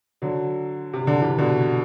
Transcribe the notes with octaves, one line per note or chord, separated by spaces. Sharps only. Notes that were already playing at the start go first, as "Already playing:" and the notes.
D3 F#3
C3
D3
C3 E3
B2 D3